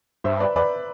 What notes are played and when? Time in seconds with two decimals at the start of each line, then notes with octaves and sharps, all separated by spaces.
0.24 G2 C5 E5
0.40 B4 D5
0.55 E2 B4 D5